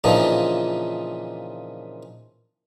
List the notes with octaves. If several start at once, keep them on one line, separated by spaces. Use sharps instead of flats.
A#2 C#3 E3 F3 D4 D#4